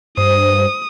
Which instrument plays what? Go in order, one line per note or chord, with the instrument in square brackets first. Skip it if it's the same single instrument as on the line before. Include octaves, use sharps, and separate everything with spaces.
[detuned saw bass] G2 [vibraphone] C5 [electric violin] D#6